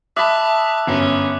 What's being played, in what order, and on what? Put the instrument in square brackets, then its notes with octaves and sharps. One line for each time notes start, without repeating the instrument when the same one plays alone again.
[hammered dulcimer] E5 B5 [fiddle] A5 [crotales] D6 D#6 F#6
[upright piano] G1 F#2 [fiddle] C#4